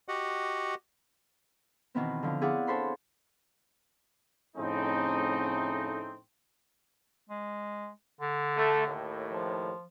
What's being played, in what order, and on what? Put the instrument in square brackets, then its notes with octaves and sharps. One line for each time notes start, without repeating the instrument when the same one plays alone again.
[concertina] F#4 G4 D#5 F#5
[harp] B2 D#3 E3 B3 C4
D3 F3
E4 G#4 C#5 D5 F5 F#5
D4 A4 C5 C#5 B5 C6
[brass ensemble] F2 A2 C#3 A3 C4 D#4
[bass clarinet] G#3
D3
[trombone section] A3
D#2 A2
[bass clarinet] F3